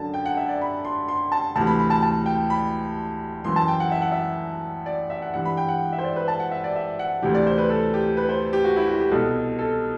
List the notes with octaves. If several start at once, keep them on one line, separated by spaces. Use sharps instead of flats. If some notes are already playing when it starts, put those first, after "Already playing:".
Already playing: F#2 D3 A5
G5
F#5
E5
D5
B5
C6
C6
A5
D2 C3 E3 A5
B5
B5
A5
A5
G5
B5
F#2 E3 C6
A5
G5
F#5
E5
F#5
E5
D5
E5
F#5
G2 E3 F#5
B5
G5
F#5
E5
C5
D5
B4
A5
F#5
E5
D5
E5
F#5
D2 C3 E3 G4
D5
C5
B4
A4
G4
B4
C5
G4
F#4
E4
F#4
G4
C2 B2 A4
A4